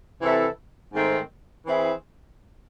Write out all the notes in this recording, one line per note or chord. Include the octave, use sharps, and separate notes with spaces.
C3 E3 C4 E4 A4
G#2 D#3 A3 C4
E3 C4 E4 G#4